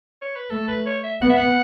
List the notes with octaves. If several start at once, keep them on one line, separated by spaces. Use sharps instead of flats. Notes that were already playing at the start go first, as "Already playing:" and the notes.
C#5
B4
A3 A4
B4
C#5
E5
B3 F#5
E5
F#5